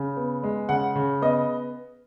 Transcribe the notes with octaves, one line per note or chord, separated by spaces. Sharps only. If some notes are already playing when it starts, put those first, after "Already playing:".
Already playing: C#3
B3
G#3
C#3 F#5
C#3
B3 D#5